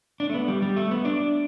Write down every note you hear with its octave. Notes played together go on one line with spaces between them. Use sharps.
D4
A3
B3
G3
G3
A3
B3
D4